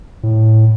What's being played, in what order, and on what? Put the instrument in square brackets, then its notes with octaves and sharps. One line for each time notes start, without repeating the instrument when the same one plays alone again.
[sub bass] A2